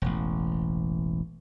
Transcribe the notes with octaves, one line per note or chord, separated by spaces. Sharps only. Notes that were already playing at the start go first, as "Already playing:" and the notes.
E1 A1